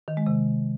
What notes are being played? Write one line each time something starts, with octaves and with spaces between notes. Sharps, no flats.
D#3
G#3
C3